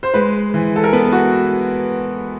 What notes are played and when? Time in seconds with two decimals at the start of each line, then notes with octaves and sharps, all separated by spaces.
0.03 C5
0.14 G#3 B4
0.54 E3
0.76 A4
0.84 A#4
0.93 B3 B4
1.13 F#4